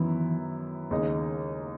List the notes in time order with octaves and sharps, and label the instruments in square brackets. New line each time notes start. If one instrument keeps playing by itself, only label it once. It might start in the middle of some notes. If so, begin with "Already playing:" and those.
Already playing: [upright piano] F#2 D#3 F#3 B3 E4 [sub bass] E3
[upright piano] D#2 C#3 G#3 D#4